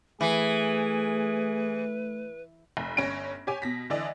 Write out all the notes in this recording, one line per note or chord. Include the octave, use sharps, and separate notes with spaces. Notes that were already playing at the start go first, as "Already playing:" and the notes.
E3 A3 G#4 B4
F1
G1 C#4 A#6 D7
G4 C#5 G#5 D6
B2 A#6 B6
D3 E3 D5 D#5